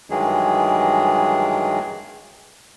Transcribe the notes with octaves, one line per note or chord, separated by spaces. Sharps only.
G2 D#3 E3 F#3 G#3 G#4